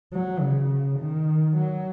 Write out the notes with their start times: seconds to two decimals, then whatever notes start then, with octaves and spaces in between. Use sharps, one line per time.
0.13 F#3
0.41 C#3
1.00 D#3
1.57 F#3